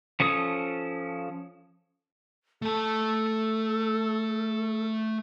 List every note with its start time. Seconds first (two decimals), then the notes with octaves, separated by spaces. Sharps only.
0.20 F3 C#4 A4 D#6
2.62 A3 A4 A5